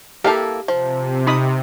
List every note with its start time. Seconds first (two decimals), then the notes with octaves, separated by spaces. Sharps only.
0.24 A#3 E4 G4 A4 F5
0.68 C3 F3
1.27 D#4 B5 D#6